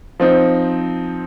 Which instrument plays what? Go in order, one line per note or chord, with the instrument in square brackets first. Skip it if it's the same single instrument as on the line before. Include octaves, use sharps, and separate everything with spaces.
[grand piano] F3 C4 D#4